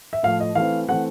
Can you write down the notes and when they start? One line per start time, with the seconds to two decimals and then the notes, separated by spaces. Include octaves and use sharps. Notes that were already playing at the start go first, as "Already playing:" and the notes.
0.13 E5
0.23 A2 F3 A3 F5
0.40 D#5
0.55 E3 A3 C4 F5
0.89 E3 A3 C4 F#5